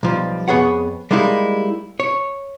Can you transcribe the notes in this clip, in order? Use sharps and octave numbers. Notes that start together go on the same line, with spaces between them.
B1 F3 G3
F2 B3 G#4 C#5 F#5
G3 G#3 A#3 D#4 E4
C#5